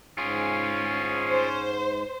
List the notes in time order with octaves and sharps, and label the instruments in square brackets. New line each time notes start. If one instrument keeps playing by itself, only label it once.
[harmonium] G#2 [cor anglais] C#4 [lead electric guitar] F4 G#4
[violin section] C5